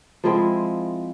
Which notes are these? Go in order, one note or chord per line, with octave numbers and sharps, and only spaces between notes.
F3 G#3 C4 E4